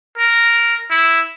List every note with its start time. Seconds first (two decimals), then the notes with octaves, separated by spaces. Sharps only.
0.18 A#4
0.91 E4